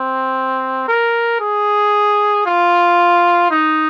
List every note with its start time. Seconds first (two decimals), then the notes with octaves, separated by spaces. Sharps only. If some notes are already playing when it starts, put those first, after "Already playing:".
Already playing: C4
0.88 A#4
1.40 G#4
2.46 F4
3.51 D#4